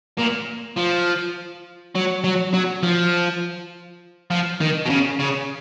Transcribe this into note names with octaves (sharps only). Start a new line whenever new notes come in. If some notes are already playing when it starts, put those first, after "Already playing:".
A#2
F3
F#3
F#3
F#3
F3
F3
D#3
B2
C#3
C#3